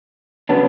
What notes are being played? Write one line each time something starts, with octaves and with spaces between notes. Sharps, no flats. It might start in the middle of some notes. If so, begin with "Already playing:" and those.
C#3 F#3 B3 D4